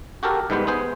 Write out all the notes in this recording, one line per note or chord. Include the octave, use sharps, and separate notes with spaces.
F#4 G4 A4 A#4
G#2 E3 G3 B3 B4 C5
B3 G#4 C5